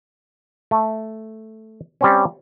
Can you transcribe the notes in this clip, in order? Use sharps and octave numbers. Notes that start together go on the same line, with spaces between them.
A3
G3 C4 C#4